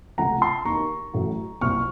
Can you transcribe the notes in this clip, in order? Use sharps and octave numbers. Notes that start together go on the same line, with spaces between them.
C#2 C3 F3 A3 C4 F#5 A#5
A5 C6
D#2 D#3 A#3 A#5 C#6
A1 A2 F#3 A3
C2 A#2 F#3 C4 C#6 F6